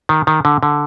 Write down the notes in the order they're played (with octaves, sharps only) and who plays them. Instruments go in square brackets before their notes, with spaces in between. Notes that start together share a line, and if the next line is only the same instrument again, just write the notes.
[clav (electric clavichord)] D#3
D#3
D3
D3